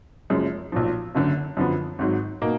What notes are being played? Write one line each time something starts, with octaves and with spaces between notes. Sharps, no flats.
F#1 F#2 F3 G#3
B1 A#2 F3
F#1 F#2 D3
F#2 D3 F3 B3
G#1 G#2 F#3
B2 A#3 D#4